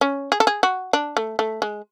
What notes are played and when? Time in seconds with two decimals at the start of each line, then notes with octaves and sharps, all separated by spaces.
0.01 C#4
0.32 G#4
0.40 A4
0.47 G#4
0.63 F#4
0.93 D4
1.17 A3
1.39 A3
1.62 G#3